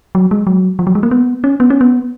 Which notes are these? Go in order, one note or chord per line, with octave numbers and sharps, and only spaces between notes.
F#3
G#3
F#3
F3
F#3
G#3
A#3
B3
C#4
B3
C#4
B3